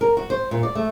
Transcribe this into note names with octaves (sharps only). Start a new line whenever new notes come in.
A#4
F#4
C5
A#2
D5
A3